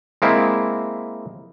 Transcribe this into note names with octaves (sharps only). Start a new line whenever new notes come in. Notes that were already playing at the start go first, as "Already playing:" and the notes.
G#3 A#3 C4 E4